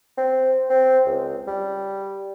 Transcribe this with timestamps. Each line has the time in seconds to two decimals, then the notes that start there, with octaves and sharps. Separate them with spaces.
0.17 C4
0.70 C4
1.06 C#2
1.47 G3